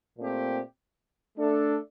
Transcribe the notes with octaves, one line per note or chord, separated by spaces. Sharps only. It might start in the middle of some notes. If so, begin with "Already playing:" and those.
A#2 A3 C4 G4
A3 D4 A4